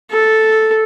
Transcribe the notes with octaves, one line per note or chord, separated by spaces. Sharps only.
A4